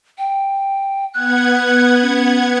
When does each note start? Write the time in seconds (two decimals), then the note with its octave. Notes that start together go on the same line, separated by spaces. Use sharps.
0.18 G5
1.14 B3 F#5 F#6 G#6
2.02 C#4